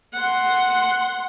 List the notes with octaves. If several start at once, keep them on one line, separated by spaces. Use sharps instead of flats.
F#5 C6